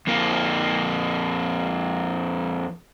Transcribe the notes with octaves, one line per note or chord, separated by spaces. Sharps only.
F2 A#3